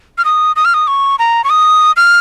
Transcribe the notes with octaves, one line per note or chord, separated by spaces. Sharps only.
F6
D#6
D#6
F6
D#6
C#6
A#5
C#6
D#6
F6